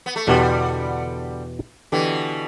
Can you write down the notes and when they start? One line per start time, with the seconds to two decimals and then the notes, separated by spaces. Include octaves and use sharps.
0.06 B3
0.16 A3
0.26 E2 B2 D3 G3 B3 G4
1.92 B2 D3 E3 B3 G4